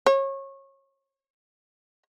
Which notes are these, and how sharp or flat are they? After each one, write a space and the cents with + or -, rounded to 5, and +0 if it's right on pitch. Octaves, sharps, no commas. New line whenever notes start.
C#5 -25